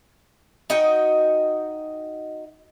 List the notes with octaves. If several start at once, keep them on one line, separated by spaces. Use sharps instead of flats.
D#4 F#4 D#5 G5